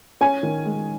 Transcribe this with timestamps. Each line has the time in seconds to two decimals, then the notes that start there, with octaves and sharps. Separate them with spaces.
0.21 C#4 G#5
0.43 D#3
0.65 G#3